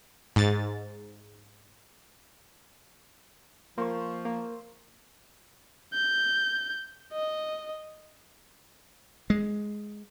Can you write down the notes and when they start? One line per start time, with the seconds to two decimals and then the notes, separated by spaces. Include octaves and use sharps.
0.36 G#2 A6
3.78 F3 A#3 C5 C#6
4.25 A#3 E6
5.94 G6
7.13 D#5
9.30 G#3